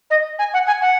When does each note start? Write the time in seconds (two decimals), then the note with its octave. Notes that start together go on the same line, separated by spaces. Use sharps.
0.10 D#5
0.39 G#5
0.54 F#5
0.67 G#5
0.82 F#5